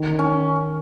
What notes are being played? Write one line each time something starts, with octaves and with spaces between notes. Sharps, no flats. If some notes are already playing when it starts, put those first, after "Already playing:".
Already playing: D#3
C#4